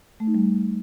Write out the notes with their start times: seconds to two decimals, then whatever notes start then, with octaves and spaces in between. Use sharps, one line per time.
0.20 A3
0.27 D#4
0.34 G3